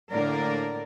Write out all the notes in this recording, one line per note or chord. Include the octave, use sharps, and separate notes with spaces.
A2 D3 A#3 D4 A#4 D5